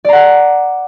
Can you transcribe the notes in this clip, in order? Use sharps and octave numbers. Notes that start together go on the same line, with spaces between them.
D5 F#5 A#5